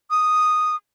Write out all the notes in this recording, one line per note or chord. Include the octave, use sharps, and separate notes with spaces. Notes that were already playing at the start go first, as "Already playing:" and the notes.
D#6